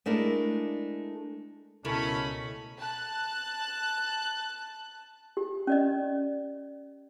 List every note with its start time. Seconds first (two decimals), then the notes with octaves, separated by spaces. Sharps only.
0.06 G#3 A3 D4 E4 A#4
1.85 C#2 B2 A3 C#4 E4 A#4 B5
2.77 A5 F#6
5.37 G4
5.67 C#4 D5 D#5